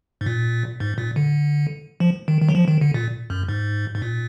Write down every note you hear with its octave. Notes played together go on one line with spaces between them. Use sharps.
G#2
A#2
G#2
A#2
D3
F3
D#3
D#3
F#3
F3
D#3
D3
A#2
F#2
G#2
G#2
A#2